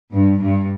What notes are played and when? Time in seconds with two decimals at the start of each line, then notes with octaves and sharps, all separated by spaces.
0.13 G2
0.41 G2